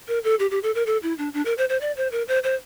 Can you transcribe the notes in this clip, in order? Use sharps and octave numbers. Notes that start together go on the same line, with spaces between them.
A#4
A4
G4
G4
A4
A#4
A4
E4
D4
D4
A#4
C5
C5
D5
C5
A#4
C5
C5